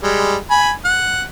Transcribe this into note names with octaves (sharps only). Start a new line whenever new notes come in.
G3 G#3
G#5 B5
F#5